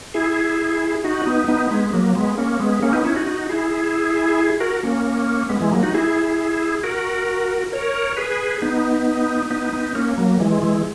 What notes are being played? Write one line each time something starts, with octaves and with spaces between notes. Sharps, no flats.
E4 G#4
D#4 F#4
B3 D#4
B3 D#4
G#3 B3
F#3 A#3
G#3 B3
A#3 C#4
G#3 B3
A#3 C#4
B3 D#4
C#4 E4
D#4 F#4
D#4 F#4
E4 G#4
F#4 A#4
A#3 C#4
G#3 B3
E3 G#3
F#3 A#3
D#4 F#4
E4 G#4
F#4 A#4
A#4 C#5
G#4 B4
B3 D#4
B3 D#4
B3 D#4
A#3 C#4
F#3 A#3
E3 G#3
E3 G#3